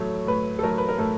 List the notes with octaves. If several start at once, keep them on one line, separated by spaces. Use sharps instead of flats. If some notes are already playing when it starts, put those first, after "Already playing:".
Already playing: A2 F#3 A3 C#5
A2 B4
A4
F#3 A3 A#4
B4
A#4
A2 A4